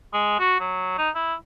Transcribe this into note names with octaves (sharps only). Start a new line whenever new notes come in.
G#3
F#4
F#3
D#4
E4